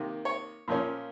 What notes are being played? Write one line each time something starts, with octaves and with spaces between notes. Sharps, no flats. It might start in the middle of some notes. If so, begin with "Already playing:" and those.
Already playing: C3 D#3 A#3
C#5
A#2 F3 A#3 C#4